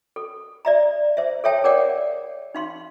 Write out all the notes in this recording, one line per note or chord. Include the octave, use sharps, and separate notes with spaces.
A4
D5 E5 A#5
C5 E5
A4 C#5 E5 G5 A5
G#4 A#4 C#5 D5 F#5 G5
D#4 F5 C6